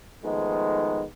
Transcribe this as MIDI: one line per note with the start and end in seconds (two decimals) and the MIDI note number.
0.23 1.03 51
0.23 1.03 53
0.23 1.03 56
0.23 1.03 57
0.23 1.03 59
0.23 1.03 63